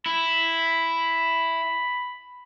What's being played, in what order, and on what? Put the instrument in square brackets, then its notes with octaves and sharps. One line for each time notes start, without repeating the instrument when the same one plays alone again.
[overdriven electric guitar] E4 [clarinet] B5